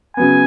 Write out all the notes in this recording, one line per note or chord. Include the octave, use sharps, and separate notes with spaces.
C#3 F#3 B3 G#5